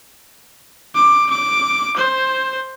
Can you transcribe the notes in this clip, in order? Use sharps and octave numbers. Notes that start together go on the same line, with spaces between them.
D6
D6
C5